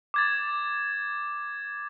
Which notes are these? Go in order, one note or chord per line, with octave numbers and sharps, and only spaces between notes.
D6 G#6 A6